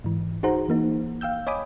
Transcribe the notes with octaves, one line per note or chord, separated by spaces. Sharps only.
G#2 E3
D#4 F#4 G#4 C5 F#5 A#5
E3 A#3 D#4
F5 G5 E6 G6
C#5 D#5 G#5 B5 D6 D#6